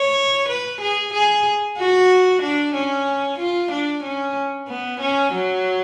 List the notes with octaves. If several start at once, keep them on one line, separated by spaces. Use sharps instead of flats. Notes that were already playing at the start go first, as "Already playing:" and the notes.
Already playing: C#5
B4
G#4
G#4
F#4
D4
C#4
F4
D4
C#4
B3
C#4
F#3